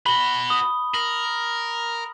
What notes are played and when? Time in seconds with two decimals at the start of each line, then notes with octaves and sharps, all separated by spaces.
0.06 F#4 B4 B5 G7
0.50 D#6
0.94 A#4 F#7